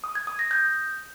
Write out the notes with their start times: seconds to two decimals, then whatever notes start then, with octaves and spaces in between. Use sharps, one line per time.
0.04 D#6
0.15 G#6
0.27 D#6
0.39 A#6
0.51 G6